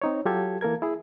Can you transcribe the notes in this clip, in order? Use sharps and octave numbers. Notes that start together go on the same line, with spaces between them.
C4 D#4 C#5
F#3 F4 G4 A4 G#6
E3 A#3 A4 A#4 G#6
E4 G#4